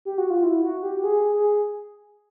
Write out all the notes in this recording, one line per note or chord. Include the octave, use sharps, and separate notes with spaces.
G4
F#4
F4
E4
F#4
G4
G#4
G#4